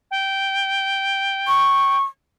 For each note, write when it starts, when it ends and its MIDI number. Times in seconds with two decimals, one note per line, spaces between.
0.11 1.98 79
1.48 2.04 85